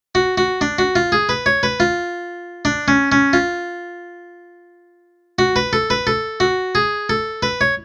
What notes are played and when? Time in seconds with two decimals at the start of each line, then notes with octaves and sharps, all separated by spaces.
0.15 F#4
0.38 F#4
0.61 D4
0.78 F#4
0.96 F4
1.12 G#4
1.29 B4
1.46 C#5
1.63 B4
1.80 F4
2.65 D4
2.88 C#4
3.12 C#4
3.33 F4
5.39 F#4
5.56 B4
5.73 A4
5.90 B4
6.07 A4
6.40 F#4
6.75 G#4
7.09 A4
7.43 B4
7.61 C#5